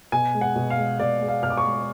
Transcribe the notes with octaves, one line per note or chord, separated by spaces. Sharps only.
B2 G#5
G#3
F#5
B2
F5
G#3
B2 D5
G#3
F5
B2 F6
D6
C#6
G#3